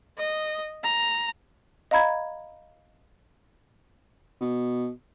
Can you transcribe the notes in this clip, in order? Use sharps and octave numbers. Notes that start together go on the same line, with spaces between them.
D#5
A#5
D#5 F5 A#5 B5 G#6
B2